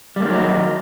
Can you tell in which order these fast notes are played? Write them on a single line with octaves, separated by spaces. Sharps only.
G3 A#3 D#3 F#3 D#4